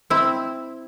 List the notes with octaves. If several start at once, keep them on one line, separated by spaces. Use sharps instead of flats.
C4 E4